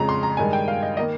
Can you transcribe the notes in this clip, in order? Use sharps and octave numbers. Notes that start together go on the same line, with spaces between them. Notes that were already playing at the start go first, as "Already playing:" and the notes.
Already playing: F2 C#3 G#3 A#5
C6
A#5
G2 D#3 G#3 G#5
G5
F5
D#5
D#3 A#3 D#5